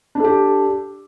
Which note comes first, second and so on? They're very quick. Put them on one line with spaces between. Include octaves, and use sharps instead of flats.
D4 A4 G4